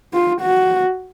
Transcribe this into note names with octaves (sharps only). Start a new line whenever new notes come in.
F4
F#4